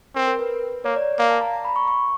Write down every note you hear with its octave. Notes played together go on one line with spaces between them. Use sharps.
C4 A#4
A#4
B4
A#3 C#5
D5
A#3 F5
A5
A#5
A#5
B5
C#6
C#6